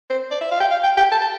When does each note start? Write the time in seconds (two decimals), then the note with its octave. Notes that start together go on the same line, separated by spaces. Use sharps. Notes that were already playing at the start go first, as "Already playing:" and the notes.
0.10 C5
0.31 D5
0.41 E5
0.51 F5
0.60 G5
0.71 F5
0.84 G5
0.97 G5
1.12 A5
1.22 A5